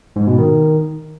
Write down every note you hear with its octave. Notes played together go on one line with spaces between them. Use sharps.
G#2
B2
D#3